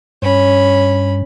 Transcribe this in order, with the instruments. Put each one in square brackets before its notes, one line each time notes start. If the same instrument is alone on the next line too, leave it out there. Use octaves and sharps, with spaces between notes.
[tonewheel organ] G2 [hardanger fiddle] C#4 B5